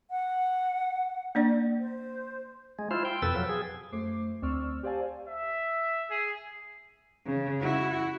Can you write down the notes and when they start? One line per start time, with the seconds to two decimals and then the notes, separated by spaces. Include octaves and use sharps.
0.10 F#5
1.35 A#3 D4 D5
1.80 C5
2.79 G#3
2.91 E4 F4 C5
3.05 G5
3.22 F2 B2 A4 B4 E6
3.35 F3 F#3
3.49 G#4
3.92 F#2 A3 C5 D6 C7
4.42 D2 C4 D5 C#6 E6 F6
4.83 G4 C5 D5 F5 G#5 A5
5.28 E5
6.11 G#4
7.26 C#3
7.61 E4 F#4